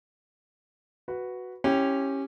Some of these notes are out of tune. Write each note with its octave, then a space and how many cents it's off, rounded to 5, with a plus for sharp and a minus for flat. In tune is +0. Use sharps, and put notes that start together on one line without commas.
F#4 +0 B4 +0
C#4 -15 E4 -10 G4 +0